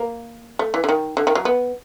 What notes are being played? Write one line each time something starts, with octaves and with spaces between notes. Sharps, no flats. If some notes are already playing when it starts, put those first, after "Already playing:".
Already playing: A#3
A3
E3
D3
D#3
D3
D#3
F#3
B3